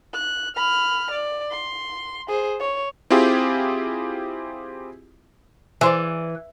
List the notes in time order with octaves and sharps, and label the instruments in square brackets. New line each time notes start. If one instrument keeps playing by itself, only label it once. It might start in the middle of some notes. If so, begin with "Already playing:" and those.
[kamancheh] F#6
B5 F6
D5
C6
G#4 C5
C#5
[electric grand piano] C4 E4 F4 G4 G#4
[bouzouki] E3 [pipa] G#4 C5 D5